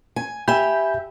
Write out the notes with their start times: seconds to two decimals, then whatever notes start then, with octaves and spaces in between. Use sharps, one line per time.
0.16 G#5
0.48 G4 E5 G#5 B5 G6